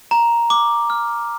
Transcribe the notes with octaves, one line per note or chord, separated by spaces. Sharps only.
A#5
D6
F6